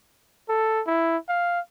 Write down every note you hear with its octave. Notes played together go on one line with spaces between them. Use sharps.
A4
E4
F5